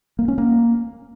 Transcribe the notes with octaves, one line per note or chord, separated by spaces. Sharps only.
A#3
C#4
A#3